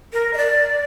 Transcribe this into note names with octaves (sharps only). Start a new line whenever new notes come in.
A#4
D#5
D5